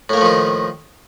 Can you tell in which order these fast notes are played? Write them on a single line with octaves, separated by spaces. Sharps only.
A2 A#3 A3 F3 D#3